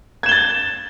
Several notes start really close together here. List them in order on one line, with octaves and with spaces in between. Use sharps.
G#6 E7 G7 A6